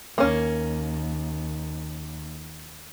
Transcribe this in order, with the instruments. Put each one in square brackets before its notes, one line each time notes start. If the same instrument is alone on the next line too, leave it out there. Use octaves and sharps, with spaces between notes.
[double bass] D#2 [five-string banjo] A#3 C#4